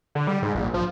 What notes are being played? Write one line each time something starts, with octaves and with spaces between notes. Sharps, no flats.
D3
G3
G#2
A#1
F3